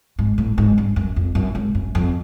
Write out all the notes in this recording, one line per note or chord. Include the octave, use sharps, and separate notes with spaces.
G#2
A2
G#2
G2
F#2
F2
F#2
G#2
F#2
F2